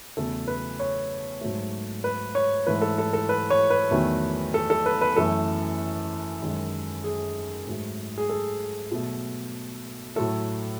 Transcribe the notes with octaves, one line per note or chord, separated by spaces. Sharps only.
E2 C#3 F#3 A3 A4
B4
C#5
G#2 F#3 A3
B4
C#5
G#2 E3 A3 B4
A4
A4
A4
B4
C#5
B4
E2 D#3 F#3 A3
A4
A4
B4
B4
F#2 E3 A3 A4
F#2 D#3 G#3
G#4
G#2 F#3 A3
G#4
A4
B2 F#3 A3
A2 F#3 A3 A4